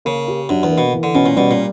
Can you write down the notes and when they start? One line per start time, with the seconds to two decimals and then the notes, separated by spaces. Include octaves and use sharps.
0.05 C#3 A#3
0.28 G4
0.49 F#2 D4
0.63 E2
0.71 A#3
0.78 B2
0.93 E3
1.03 D3
1.15 B2 C#4
1.26 A#2
1.36 B2 G3
1.51 A#2